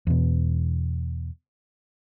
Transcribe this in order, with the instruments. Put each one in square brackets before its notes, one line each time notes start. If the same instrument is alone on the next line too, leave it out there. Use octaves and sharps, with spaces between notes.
[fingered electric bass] E2 B2